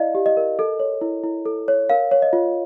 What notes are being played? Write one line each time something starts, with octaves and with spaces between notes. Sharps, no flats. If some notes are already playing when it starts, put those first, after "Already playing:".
Already playing: E4 D5 D#5 F5
G4
D#5
A#4
A4
C#5
E4
E4
A4
C#5
A#4 F5
C#5
D#5
F4